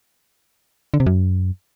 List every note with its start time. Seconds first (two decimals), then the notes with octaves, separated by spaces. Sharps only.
0.94 D3
1.00 C3
1.06 F#2